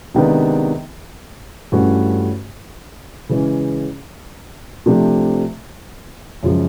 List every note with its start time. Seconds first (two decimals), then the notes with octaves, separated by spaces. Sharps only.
0.15 C3 D#3 G#3 B3 D4
1.72 G2 E3 A3 C#4 F#4
3.29 C#3 E3 G#3 C#4
4.86 C3 F3 A3 D4 G4
6.43 F#2 C#3 F3 G#3